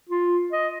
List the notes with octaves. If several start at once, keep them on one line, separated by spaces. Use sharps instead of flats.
F4
D#5